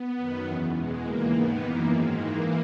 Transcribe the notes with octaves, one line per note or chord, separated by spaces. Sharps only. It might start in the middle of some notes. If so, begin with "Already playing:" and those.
Already playing: B3
F#2 D#3
E2 C#3 E3
E2 B2 G#3
D#2 C#3 E3 A#3
G#2 D#3 B3
F#2 E3 A#3
G#2 D#3 G#3
G#2 E3 A#3